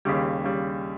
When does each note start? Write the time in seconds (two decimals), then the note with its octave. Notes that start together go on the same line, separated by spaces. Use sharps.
0.05 D#2 C#3 G3
0.44 C#3 G3